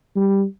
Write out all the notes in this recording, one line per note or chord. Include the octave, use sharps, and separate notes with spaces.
G3